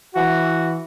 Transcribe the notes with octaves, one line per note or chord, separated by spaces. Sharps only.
E3 F#4